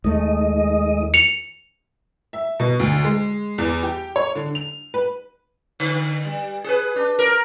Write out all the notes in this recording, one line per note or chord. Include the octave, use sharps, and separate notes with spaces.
D#2 G#3 A3 D#4 D#5
C#7 F7
E5
B2
D2
G#3
E2
G4
C#5
D3
F7
B4
D3
G3
G#4 B4
D4
A#4